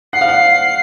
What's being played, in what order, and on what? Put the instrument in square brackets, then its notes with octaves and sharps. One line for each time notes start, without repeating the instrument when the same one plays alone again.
[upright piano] F#5 [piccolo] C7
[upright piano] F5
F#5